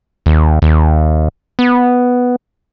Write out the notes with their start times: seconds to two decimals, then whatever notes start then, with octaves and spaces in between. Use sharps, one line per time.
0.26 D#2
0.62 D#2
1.59 B3